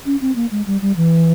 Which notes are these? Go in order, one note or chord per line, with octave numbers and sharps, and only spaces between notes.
C#4
C4
A#3
G#3
G3
G3
E3